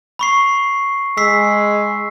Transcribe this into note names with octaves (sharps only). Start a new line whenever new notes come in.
B5 C#6 C7
G#3 E6 B6 C7